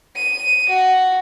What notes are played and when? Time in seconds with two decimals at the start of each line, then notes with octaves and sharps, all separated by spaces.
0.16 D#7
0.69 F#4